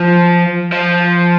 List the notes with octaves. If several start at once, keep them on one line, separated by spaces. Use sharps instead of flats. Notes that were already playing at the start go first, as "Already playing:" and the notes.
Already playing: F3
F3